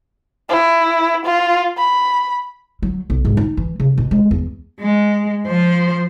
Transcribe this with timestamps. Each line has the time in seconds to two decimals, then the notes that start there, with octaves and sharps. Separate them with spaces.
0.49 E4
1.25 F4
1.78 B5
2.83 F#3
3.10 B1
3.25 G#2
3.37 D#4
3.57 E3
3.80 C#3
3.98 B2
4.11 G#3
4.31 E2
4.80 G#3
5.46 F3 C5